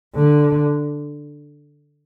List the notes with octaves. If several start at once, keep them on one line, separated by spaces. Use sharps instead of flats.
D3